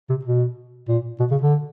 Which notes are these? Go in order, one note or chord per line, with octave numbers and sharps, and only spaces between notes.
C3
B2
A#2
B2
C#3
D3